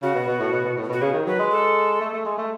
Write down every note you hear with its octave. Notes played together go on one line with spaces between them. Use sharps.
C#3 F#4
B2
B2
A2
B2
B2
A2
B2 F#4
C#3 G#4
D#3
F#3 B4
G#3
A4
A3
A3
G#3
A3